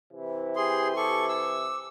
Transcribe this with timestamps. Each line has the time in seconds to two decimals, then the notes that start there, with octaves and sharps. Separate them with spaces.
0.12 C3 E3 E4
0.56 G4 G#4 C6
0.97 A4 C#6 D6
1.29 E6